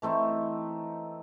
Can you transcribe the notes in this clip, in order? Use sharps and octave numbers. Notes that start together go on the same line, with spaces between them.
E3 A3 C4 D#4